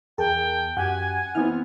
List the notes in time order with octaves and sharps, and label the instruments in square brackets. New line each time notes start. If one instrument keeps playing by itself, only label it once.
[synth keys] E2 [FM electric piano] G#4 A#4 A5 [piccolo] G5
[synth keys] F#2 G4 [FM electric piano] F#5 F#6 [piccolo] G#5
[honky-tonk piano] E3 B3 C4 [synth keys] F6